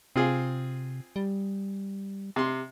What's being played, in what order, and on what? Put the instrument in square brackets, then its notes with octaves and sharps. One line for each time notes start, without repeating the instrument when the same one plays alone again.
[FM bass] C3 [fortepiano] C4 F4 G#4
[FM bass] G3
[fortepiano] C3 C6